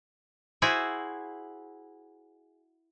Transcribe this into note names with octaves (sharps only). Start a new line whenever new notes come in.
E4 F#4 G#4 C5 E5